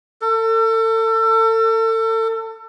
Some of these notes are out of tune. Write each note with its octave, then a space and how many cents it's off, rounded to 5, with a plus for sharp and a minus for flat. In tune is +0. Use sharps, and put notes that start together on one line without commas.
A4 +35